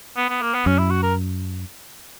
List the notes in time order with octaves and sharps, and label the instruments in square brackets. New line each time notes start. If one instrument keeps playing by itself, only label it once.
[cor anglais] B3
B3
A#3
B3
[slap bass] F#2 [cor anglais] C#4
[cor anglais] E4
F#4
A#4